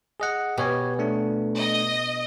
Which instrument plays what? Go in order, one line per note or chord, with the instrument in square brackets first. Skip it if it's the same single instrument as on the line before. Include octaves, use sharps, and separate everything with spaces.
[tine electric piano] G#4 D#5 F#5
[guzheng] B2 [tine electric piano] G4 C#5 G#5
[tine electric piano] A3 D4
[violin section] D#5